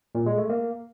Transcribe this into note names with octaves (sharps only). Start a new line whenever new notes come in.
A#2
G#3
A3
A#3